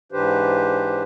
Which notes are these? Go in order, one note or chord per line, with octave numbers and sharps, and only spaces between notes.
G#2 E3 D4 G4 B4 C5